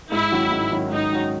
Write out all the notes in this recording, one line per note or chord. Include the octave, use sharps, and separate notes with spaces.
G#2 E4
D#3 F#3 C#4 F#4
G#2
D#3 F#3 C#4 F#4
G#2 D#4
D#3 F#3 C#4 F#4